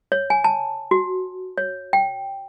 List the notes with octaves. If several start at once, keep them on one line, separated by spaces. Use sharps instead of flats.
C#5
G#5
A5
F#4
C#5
G5